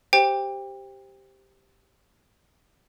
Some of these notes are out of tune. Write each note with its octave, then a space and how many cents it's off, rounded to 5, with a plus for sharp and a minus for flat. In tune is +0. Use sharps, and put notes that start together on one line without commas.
G4 +0 C5 +0 G5 +25